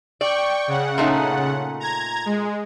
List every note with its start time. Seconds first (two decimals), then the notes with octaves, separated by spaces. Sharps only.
0.21 D5 G5 C#6
0.67 C#3 F#5
0.98 A#2 A3 D#4
1.80 A#5 G#6
2.26 G#3